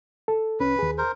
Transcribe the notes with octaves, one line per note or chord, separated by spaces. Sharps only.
A4
C2 C#4 B4
D#2 G#4
A#4 C5